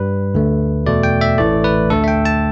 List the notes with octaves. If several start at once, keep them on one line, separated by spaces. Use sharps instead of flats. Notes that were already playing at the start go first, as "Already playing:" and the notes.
Already playing: G2 G3 B4
D2 D3 A3
E2 B2 A3 D5
G5
E5
A1 A2 E3 A3 D5
B4
D2 D3 A3 A4
E5
G5
A5